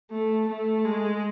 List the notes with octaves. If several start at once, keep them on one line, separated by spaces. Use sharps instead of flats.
A3
A3
G#3